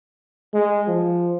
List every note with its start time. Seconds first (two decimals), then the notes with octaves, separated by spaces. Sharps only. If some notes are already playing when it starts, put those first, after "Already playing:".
0.54 G#3
0.88 F3